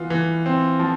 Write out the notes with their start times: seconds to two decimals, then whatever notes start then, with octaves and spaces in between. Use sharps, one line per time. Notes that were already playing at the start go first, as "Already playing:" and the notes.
Already playing: E3 B3 F4
0.10 E3
0.46 C4
0.80 F3